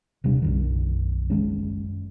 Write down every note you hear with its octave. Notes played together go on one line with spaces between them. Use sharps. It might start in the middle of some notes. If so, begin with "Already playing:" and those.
D#1 C3 G3 D4
B1 F#2 D#3
F#1 D#3 G#3 C#4